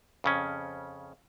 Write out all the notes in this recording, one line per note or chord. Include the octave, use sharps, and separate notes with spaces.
F2 C#3 C#4